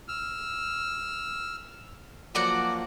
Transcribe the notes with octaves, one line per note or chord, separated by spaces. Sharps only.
E6 F6
F3 F#3 A#3 F#4 D5 F#5